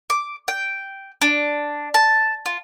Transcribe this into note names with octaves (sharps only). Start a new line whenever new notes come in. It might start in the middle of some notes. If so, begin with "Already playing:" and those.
D6
G5
D4
A5
F4